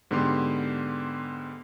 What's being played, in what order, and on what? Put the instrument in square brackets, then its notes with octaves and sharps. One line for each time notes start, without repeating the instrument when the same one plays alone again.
[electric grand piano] G#2 D3 B3 G4 C6